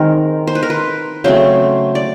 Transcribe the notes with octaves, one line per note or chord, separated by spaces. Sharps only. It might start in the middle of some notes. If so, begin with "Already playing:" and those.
Already playing: D#3 G#3 C4 A#4
C5
B4
A#4
B4
C#3 F#3 A3 C4 C5
D5